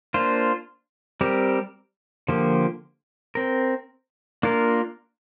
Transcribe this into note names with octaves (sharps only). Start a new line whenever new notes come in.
A#3 D4 F4 C5
G3 C4 G4 A#4
D3 F3 A#3 G4
C4 A#4
A#3 D4 F4 A#4